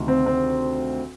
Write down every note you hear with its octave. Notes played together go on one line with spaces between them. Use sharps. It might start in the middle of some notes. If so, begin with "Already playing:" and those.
Already playing: D2 C3 D#3
C4
C4